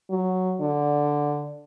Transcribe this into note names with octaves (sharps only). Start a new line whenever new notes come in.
F#3
D3